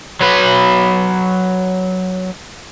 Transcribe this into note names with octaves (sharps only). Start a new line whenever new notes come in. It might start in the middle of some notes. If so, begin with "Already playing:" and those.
F#3 B4